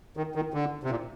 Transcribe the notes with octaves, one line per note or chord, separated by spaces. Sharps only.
D#3
D#3
D3
C3
A#2